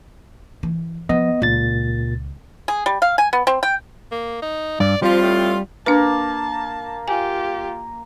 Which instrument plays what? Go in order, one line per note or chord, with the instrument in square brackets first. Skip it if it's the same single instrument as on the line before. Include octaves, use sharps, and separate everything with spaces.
[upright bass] E3
[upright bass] F3 [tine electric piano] B3 D#5
[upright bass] C#2 [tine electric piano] A#2 A6
[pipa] G#4
G3
F5
G#5
B3
C4
G5
[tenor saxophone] A#3
D#4
[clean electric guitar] G2 [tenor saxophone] D5
[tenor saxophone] F3 [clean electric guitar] G3 [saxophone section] C4 F4
[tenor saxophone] A2
[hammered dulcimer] A#3 [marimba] D4 B4 [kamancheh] A5
[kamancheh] F4 G4 [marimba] G#5